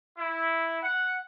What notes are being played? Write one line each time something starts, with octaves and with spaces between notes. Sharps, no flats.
E4
F#5